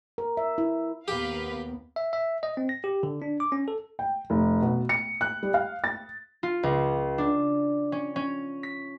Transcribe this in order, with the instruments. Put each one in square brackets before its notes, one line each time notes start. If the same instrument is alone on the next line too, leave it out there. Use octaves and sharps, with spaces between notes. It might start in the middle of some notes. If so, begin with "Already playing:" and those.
[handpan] A#4
E5
E4
[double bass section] D#2 B3 [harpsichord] G4 [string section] A#4 B4 F5
[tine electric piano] E5
E5
D#5
C4
A#6
G4
D3
D4
D6
C#4
A4
[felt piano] G5
F1
B2
C#7
F#6
G3
F5
A6
[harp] F4
C#2
D4
C#4
C#4
B6